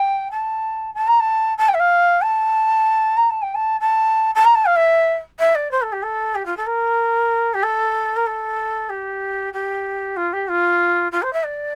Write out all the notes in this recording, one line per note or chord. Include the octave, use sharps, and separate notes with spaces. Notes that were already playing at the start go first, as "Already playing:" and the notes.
Already playing: G5
A5
A5
A#5
A5
A5
G5
E5
F5
A5
A#5
A5
G5
A5
A5
A5
A#5
A5
F5
E5
E5
D5
C5
A4
G4
A4
G4
F4
A4
A#4
G4
A4
A#4
A4
G4
G4
F4
G4
F4
F4
C5
E5
D5